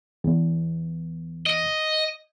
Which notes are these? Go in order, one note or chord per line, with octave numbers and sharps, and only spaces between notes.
E2
D#5